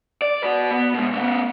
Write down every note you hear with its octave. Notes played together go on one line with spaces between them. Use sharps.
D5
F#4 B4
B3
B2 G#3
A3 B3